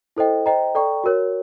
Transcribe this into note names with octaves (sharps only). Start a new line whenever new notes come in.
E4 A4 C5 D#5 G5
C5 D#5 G5 A#5
A4 D5 G5 A#5 C#6
F#4 A#4 C#5